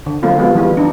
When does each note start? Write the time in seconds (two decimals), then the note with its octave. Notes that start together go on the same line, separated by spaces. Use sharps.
0.06 D3
0.23 F#3 A3 A#3 C4 F4 A4
0.38 F3 G3 G#3 B3 F4 F#4
0.55 E3 G3 G#3 E4
0.77 D4 D#4